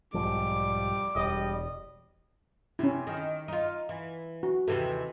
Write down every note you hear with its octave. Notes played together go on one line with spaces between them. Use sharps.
B1 G#2 F3 G3 D6
E1 G3 D#5
C3 C#4 E4
D#3
D#4 F4
E3
F#4
D#2 C3 E3 A4